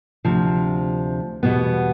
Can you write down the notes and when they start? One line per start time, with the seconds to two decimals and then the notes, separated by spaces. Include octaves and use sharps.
0.25 D2 C3 F3
1.43 E2 B2 G3 B3